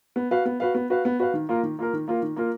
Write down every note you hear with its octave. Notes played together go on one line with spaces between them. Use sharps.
B3
F#4 B4 F5
B3
F#4 B4 F5
B3
F#4 B4 F5
B3
F#4 B4 F5
D#3
A#3 F4 A#4
D#3
A#3 F4 A#4
D#3
A#3 F4 A#4
D#3
A#3 F4 A#4